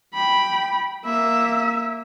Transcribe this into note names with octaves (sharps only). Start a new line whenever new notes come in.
G5 B5
A#3 E5